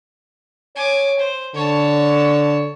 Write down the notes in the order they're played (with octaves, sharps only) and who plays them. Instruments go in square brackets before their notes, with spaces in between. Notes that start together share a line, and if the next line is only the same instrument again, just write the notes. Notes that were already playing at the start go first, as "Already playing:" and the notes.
[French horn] C#5 [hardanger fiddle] G#5 D6
[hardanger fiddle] C5
[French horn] D3 [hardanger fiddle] C#5 A5